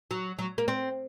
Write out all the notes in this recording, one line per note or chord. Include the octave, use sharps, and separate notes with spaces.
F#3
F#3
A#3
C4